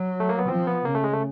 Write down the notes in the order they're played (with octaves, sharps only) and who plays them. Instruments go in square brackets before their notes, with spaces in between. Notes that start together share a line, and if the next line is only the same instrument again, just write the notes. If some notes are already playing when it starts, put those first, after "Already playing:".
Already playing: [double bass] F#3
[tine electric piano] A3
A#3
B3
[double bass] F3 [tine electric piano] C4
[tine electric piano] B3
[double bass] C#3 [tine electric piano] A#3
[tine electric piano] A3
G#3
A3